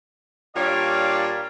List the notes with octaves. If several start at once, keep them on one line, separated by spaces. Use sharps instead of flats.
A#2 G3 D4 C#5 D5 F5